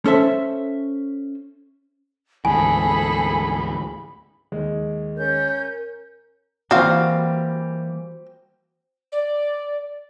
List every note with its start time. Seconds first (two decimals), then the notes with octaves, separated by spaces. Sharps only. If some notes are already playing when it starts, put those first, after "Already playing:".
0.06 C#4 A4 C5 E5
2.45 D2 G#2 E3 G#4 A4 G#5 B5
4.52 D#2 G#3
5.17 C#4 A#4 G6
6.71 E3 G3 A#3 C4 F#4 F5
9.12 D5